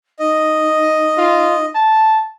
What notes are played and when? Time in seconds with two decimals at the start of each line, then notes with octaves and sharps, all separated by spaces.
0.19 D#4 D#5
1.17 F4
1.75 A5